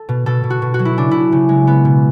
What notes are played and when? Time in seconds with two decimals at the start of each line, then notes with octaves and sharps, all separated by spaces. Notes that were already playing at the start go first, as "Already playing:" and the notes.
Already playing: A4
0.09 B2
0.26 B2 A4
0.44 B2
0.50 F#4
0.62 B2
0.74 F#4
0.79 F#3
0.85 E4
0.97 C#3 D4
1.11 C#3 E4
1.32 C#3
1.49 G#3
1.67 B3
1.85 B2